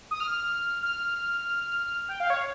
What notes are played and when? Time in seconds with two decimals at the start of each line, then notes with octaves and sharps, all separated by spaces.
0.11 D#6
0.20 F6
0.83 F6
2.09 G5
2.20 F5
2.30 C#5